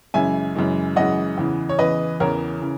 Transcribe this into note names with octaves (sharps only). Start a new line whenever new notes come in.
F#2 C#3 E3 G#3 E5 G#5
F#2 C#3 E3 G#3
F#2 C#3 E3 G#3 D#5 F#5
E2 C#3 E3
C#5
E2 C#3 E3 B4 D#5
E2 C#3 E3 A#4 C#5
C#3 E3